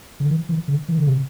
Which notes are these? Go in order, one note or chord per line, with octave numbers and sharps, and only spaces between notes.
D3
E3
E3
D3
E3
D3
C3